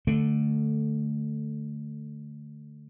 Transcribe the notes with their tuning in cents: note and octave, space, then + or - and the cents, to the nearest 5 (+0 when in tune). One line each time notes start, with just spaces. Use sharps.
D3 +5 A3 +0